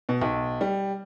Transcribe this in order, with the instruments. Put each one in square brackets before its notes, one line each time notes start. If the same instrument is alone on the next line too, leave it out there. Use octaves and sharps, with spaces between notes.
[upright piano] B2
B1
G3